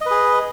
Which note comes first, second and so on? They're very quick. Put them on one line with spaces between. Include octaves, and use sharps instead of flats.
D#5 B4 G#4